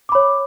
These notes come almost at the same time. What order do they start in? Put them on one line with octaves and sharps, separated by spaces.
D6 B5 C#5